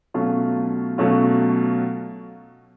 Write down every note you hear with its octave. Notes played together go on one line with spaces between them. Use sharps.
B2 F#3 A3 C#4 F4
B2 F#3 A3 C#4 F4